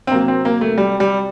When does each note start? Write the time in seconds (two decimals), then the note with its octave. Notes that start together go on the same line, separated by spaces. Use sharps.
0.07 C4
0.11 C3 F#3 A#3
0.28 C4
0.45 A#3
0.61 A3
0.78 G3
1.00 G3